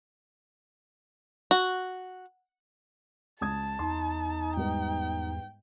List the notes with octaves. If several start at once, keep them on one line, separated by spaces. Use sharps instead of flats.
F#4
C#2 A5 D#6 G#6
E2 D#4 C6
G#2 G3 B3 G5